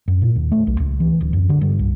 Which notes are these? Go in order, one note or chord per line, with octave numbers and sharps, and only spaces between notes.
F#2
A#2
D#2
A3
B1
C#2
E3
D1
F#2
D3
G2
C2